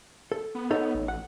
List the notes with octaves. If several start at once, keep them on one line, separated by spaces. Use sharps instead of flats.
A4
B3
D#4 A4 C#5
A1
F#5